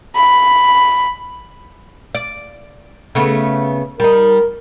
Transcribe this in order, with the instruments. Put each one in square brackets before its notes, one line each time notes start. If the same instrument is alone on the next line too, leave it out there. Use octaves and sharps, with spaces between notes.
[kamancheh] B5
[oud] D5
C#3 A3 B3
[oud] G3 D#4 [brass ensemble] A#4